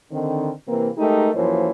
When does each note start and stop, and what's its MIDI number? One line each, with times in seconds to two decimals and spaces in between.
0.12 0.50 50
0.12 0.50 51
0.12 0.50 60
0.68 0.89 48
0.68 0.89 52
0.68 0.89 58
0.68 0.89 60
0.68 0.89 70
0.68 0.89 71
0.97 1.29 56
0.97 1.29 57
0.97 1.29 63
0.97 1.29 67
0.97 1.29 70
0.97 1.29 75
1.34 1.69 42
1.34 1.69 52
1.34 1.69 53
1.34 1.69 58
1.34 1.69 72
1.34 1.69 73